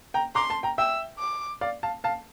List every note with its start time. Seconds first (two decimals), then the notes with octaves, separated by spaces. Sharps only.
0.14 G5 A#5
0.35 A#5 C6 D6
0.50 A5 C6
0.63 G5 A#5
0.78 E5 G5 E6
1.19 D6
1.61 D5 F5
1.83 F5 A5
2.04 F5 A5